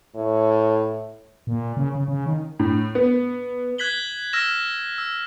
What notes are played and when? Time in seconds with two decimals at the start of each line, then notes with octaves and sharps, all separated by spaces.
0.16 A2
1.47 A#2
1.77 C#3
1.95 C#3
2.08 C#3
2.26 D#3
2.59 A2
2.95 B3
3.78 F#6 G#6 B6 F#7 G7
4.33 E6 F6 A#6 E7
4.98 E6